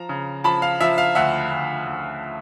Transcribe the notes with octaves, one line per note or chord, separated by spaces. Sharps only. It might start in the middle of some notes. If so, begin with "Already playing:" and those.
Already playing: F3 A#5
C#3
F3 A5 B5
F5
F3 E5
F5
D2 E5 F#5
D2
D2